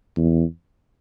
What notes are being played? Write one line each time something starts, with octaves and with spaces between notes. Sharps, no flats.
E2